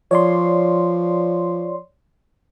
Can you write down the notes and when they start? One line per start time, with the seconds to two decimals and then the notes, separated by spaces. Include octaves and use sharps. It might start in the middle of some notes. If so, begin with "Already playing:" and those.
0.11 F3 C#5 D5 C6